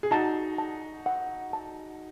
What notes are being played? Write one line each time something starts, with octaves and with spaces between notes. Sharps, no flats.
G#4
D#4 F#4 A5
A5
F#5
A5